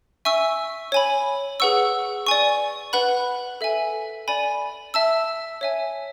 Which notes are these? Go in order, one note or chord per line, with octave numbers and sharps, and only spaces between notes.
E5 G#5 C#6 E6
C#5 G#5 B5
G#4 B4 F#5 C#6 E6
D5 G#5 C#6
B4 F#5 B5 F#6
A4 E5 G#5
D5 G#5 B5
E5 A5 E6
C#5 E5 G#5